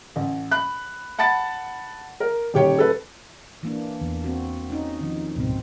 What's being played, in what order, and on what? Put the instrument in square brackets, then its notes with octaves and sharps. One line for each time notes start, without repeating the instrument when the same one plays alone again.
[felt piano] A1
B5 F#6
F#5 A5 B5 A6
A#4
D#1 G4 C#5 G5
A4 B4
[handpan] E3 A#3 D4
[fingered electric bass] E2
[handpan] C4 F#4
C#4 D#4
D#3 F3
[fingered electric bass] D#1 G#1 C#2 [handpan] B2 C4